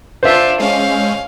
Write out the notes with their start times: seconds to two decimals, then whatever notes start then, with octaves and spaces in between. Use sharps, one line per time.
0.23 D4 F4 C5 E5
0.60 G#3 C#4 F5